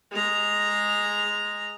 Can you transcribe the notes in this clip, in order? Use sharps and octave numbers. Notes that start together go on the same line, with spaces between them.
G#3 A#5